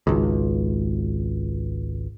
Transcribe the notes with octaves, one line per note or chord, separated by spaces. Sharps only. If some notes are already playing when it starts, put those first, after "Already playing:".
G#1 C#2